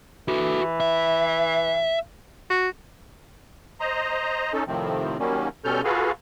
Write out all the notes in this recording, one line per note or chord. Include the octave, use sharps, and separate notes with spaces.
E3 F#4 A4
E5
F#4
C5 D#5 A#5
C#4 D#4 A4
A2 C3 D#3 F3 C4
D#3 F#3 G3 A#3 C#4
B2 G3 C#4 A4 F6 G6
F4 F#4 G#4 A4 B4 F5